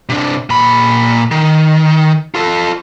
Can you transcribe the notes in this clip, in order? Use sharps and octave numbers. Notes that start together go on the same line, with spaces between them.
C3 D4
A#2 B5
D#3
F4 A4